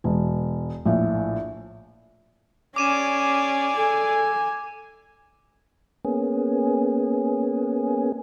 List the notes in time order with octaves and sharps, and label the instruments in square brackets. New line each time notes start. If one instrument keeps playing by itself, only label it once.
[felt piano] E1
A#1 A2
[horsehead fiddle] C#4 [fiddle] G#4 D5 [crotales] D6 D#7 E7
[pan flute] A4 [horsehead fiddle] G#5
[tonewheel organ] A#3 B3 C#4 G#4